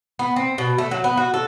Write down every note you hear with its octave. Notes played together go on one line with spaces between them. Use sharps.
B3
C4
B2
A3
F#3
B3
F#4
A4